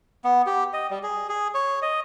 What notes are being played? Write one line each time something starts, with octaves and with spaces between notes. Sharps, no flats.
B3
G4
D#5
G3
G#4
G#4
C#5
D#5